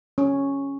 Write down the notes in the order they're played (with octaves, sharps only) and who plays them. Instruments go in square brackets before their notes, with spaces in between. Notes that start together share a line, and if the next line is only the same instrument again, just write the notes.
[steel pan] C#4